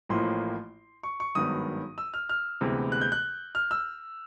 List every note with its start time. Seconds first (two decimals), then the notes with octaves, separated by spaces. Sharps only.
0.09 A1 A2 F3 A#3 C6
1.03 C#6
1.20 C#6
1.35 G#1 G2 D#3 F#3 B3 D#6
1.98 E6
2.14 F6
2.29 F6
2.61 D2 C3 E3 G#3 B3
2.92 F#6
3.01 G6
3.12 F#6
3.55 F6
3.71 E6